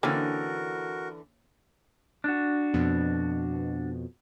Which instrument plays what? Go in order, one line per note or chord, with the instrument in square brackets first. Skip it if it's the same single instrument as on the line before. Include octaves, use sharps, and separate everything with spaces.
[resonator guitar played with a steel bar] D3 E3 [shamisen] A#3 C4 C#4 [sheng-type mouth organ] F#4 A#4
[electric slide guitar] D4 F#4
[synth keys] F2 B2